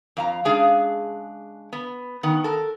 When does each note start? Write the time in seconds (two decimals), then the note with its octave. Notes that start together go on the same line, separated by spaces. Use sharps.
0.17 F2 F5 A#5
0.45 C#3 G#3 D4 G#4 F5
1.73 B3
2.23 D#3 B3
2.44 A4 A#4